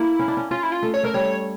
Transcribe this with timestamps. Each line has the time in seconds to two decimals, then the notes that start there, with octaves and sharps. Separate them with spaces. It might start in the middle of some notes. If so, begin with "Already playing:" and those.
Already playing: A#3 E4
0.19 C#4
0.28 D4
0.37 C#4
0.51 C#4 F4
0.63 E4
0.72 F4
0.83 A3
0.94 C#5
1.03 A3 A#4
1.14 G3 C#5